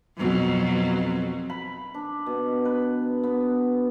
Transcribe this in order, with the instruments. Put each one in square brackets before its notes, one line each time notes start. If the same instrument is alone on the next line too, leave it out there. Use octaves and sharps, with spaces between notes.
[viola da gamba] F2 B2 F#3
[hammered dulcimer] B5
D4
B2
B4
B3